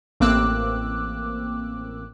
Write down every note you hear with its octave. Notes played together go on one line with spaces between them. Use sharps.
A1 A#3 C4 D6 E6 F#6